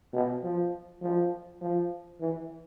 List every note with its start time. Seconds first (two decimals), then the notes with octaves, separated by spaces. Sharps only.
0.13 B2
0.43 F3
1.01 F3
1.61 F3
2.20 E3